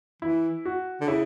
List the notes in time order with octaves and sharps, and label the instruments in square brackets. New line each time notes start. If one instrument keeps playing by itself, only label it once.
[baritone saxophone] E3 [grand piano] E4
[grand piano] F#4
[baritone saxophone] D3
[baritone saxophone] C#3 [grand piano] E4